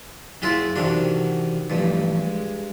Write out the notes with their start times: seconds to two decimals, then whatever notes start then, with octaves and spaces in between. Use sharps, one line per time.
0.42 F#2 G#3 E4 F4 G#4
0.76 C3 D#3 E3 D4 F#4
1.70 G2 E3 F3 A3
2.22 G#3